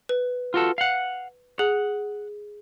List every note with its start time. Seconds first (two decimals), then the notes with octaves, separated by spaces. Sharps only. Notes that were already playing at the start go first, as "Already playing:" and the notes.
0.09 B4
0.54 F4 F#4 A4
0.78 F5 F#5
1.59 G#4 F#5